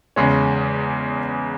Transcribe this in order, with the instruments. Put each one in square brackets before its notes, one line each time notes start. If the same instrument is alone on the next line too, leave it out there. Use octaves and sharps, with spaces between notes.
[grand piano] E2 C#3 G#3 C#4